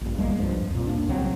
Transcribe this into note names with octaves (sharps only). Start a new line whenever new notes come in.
A#1 G2
E2 G3 G#3 A#3
C2 G2 F3 G3
F2 A#2
D#2 A#3 D4
C2 C#3 F#3 C4